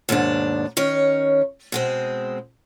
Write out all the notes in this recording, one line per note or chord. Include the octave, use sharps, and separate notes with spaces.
D#2 G#2 B2 D4
D#3 C#4 C#5
B2 G#3 C4